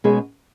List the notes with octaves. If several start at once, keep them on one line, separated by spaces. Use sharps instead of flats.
B2 G#3 C#4 G#4 B4